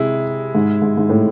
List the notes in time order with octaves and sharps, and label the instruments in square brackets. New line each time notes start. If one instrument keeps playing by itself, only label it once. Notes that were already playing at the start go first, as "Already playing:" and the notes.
Already playing: [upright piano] C3 [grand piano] G#3 E4
[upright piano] G#2
G#2
G#2
A2